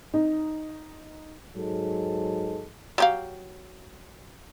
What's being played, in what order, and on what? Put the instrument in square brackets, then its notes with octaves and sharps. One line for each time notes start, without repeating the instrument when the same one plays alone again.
[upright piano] D#4
[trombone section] G#2 F#3 G#3 A4
[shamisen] F#3 G4 F5